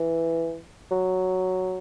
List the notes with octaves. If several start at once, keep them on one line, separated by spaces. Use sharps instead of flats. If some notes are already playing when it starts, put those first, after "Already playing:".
Already playing: E3
F#3